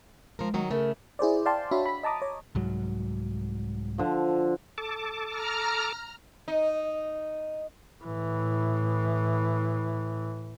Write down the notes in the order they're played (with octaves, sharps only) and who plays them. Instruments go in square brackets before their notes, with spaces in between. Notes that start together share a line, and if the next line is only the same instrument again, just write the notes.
[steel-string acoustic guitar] F3 A#4 [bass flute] G#3
[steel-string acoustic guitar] D#3 F#3 D#4
[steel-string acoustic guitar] C#3 A3 [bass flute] A#4
[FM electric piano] E4 G#4 C5 D5
D5 F5 G5 A5 C6
D4 F#4 C#5 E5 B5
B5 B6
D#5 A5 A#5 D6 D#6
C#5
[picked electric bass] C2 G#2 F#3
[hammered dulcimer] D3 F3
[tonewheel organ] A4 A5 D6
[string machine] A#5 F6
[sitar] D#4
[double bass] A2 E3